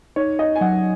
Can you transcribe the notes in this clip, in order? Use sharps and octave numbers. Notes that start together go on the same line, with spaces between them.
D#4 C#5
D#5
G#5
F#3 F#5